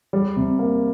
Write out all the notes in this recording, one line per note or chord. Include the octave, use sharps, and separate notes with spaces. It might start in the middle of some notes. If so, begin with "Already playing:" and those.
G3
C3
A#3